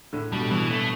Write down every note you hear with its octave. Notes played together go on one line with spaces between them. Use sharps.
A2 D3
B2 G3
B2 E3
A3